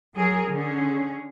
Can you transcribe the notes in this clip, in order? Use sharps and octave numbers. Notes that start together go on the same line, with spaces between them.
F#3 G#4 A#4
D3 C#4 G#4